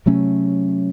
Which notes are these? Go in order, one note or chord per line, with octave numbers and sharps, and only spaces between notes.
C3 F#3 A3 C#4